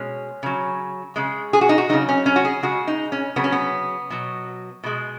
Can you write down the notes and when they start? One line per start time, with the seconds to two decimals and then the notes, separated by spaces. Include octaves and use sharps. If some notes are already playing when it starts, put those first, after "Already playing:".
Already playing: B2 G#3 C#4
0.43 C#3 F#3
1.16 C#3 G#3
1.53 G#4
1.61 F#4
1.69 D#4
1.78 F#4
1.89 C#3 F#3 D#4
2.09 C#4
2.26 C#4
2.36 F#4
2.45 G#4
2.63 C#3 G#3 F#4
2.87 D#4
3.12 C#4
3.36 C#3 F#3 B3
3.44 C#4
3.52 B3
4.10 B2 F#3
4.84 B2 G#3